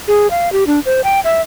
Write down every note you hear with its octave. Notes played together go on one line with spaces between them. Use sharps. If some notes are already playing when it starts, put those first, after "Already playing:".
G#4
F5
G4
D4
C5
G5
E5